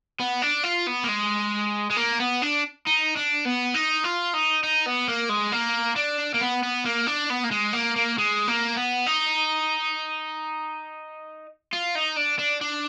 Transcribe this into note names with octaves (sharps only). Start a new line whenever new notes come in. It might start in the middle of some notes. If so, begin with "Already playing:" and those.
B3
D4
F4
B3
A#3
G#3
G#3
A#3
B3
D4
D#4
D4
B3
D#4
F4
D#4
D#4
B3
A#3
G#3
A#3
D4
A#3
B3
B3
A#3
D4
B3
A#3
G#3
A#3
A#3
G#3
A#3
B3
D#4
F4
D#4
D4
D4
D4